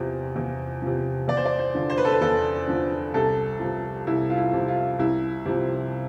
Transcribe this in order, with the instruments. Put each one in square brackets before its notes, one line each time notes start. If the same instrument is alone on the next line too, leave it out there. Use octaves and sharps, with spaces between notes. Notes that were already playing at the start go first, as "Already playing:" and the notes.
Already playing: [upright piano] E2 C3 F3
E2
C3 F3
E2 D5
C5
D5
C5
D3 F3
C5
B4
A4
B4
E2 A4
D3 F3
C2 A4
C3 F3
C2 E4
F4
E4
C3 F3
F4
C2 E4
C3 F3